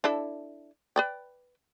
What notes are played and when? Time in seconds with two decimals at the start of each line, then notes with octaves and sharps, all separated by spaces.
0.04 D4 E4 A4
0.96 B4 D5 G5